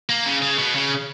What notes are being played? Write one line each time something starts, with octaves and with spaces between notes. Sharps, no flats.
A#3
C#3
C#3
B2
C#3